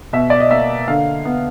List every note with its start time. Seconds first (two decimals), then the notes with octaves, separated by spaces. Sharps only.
0.13 B2 E5
0.30 D5
0.40 D#5
0.51 A#3 E5
0.88 D3 F5
1.25 B3